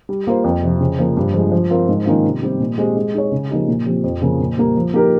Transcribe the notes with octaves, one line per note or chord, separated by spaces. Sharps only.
G3
A#3 F4 C5
F2
C3 F3
C#3
F3 A#3
G2
F3 G#3
F3
C4 F4 A#4
G#2
D#3 A#3 C#4 F4
C3
G3 C4 G4
A#2
G#3 C4 G4
G#3
D#4 G#4 C#5
C#3
F3 A#3 D#4 G4
A#2
F3 C4 G4
F2
C#3 F3 A#3
A#2
G3 A#3
F3
A#3 D#4 G4 A#4